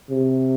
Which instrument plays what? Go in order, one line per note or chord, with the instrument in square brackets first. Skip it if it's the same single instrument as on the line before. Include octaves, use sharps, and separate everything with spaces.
[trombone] C3